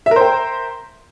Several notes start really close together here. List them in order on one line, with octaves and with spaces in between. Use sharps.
E5 A#4 C5 G5